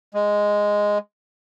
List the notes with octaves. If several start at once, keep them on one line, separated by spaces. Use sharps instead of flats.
G#3